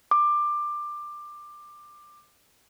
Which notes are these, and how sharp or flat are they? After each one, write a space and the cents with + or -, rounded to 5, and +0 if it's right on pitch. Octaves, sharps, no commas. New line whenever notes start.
D6 +20